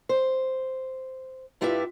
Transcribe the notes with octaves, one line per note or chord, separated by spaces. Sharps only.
C5
G2 E4 F4 G4 B4 E5